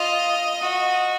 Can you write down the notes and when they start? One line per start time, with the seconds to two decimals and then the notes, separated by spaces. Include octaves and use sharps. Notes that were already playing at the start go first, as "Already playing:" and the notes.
Already playing: F4 D#5
0.61 F#4